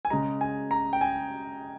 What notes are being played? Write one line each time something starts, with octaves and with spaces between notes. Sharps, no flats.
G#5
C#3 G#3 A#5
G#5
A#5
G5
G#5